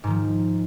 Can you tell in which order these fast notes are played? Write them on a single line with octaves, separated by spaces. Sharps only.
G#2 D#3 F3